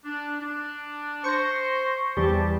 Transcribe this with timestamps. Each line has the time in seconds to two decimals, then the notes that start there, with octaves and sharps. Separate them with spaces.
0.04 D4
0.40 D4
1.24 C5 C#6 A#6
2.17 E2 F3 G3 A5